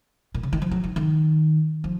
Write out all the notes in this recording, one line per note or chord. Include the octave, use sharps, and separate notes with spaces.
A#2
C#3
D#3
F3
F#3
D#3
D#3
F3